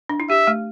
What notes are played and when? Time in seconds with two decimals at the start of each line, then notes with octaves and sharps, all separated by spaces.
0.09 D4
0.20 E4
0.30 G4 E5
0.47 A3